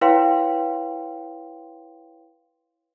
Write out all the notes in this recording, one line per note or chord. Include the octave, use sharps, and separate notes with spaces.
E4 B4 C#5 F5 G5 C6